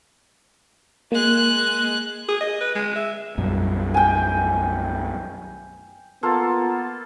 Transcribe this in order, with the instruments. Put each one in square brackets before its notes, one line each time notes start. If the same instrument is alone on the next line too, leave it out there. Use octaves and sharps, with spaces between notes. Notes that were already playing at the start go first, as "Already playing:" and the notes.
[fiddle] G#3 F#6 [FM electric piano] A#3
[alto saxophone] G#4
D#5
B4
G#3
E5
[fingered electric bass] B1 F#2 G3
[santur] G5 G#5
[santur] A#3 F4 A4 [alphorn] B3